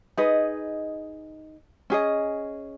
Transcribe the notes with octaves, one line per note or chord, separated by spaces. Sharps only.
D#4 G#4 B4 D#5
C#4 G#4 D#5